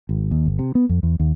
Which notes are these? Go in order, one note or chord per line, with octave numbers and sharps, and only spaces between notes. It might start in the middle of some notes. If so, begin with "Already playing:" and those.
G#1
D#2
G1
C3
B3
F2
E2
D#2